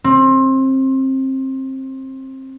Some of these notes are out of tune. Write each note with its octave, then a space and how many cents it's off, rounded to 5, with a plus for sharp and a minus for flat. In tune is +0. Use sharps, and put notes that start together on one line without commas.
C4 +25